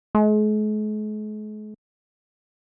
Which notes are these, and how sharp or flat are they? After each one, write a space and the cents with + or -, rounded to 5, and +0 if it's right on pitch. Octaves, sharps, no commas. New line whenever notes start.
G#3 +45